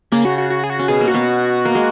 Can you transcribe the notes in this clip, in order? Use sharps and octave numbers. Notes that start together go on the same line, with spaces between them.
C#3 A#3 C#4
F#4
F#4
F#4
G#4
F#4
C#4
B2 B3 G#4
A#3
F#4
B2 B3
A#3
G#3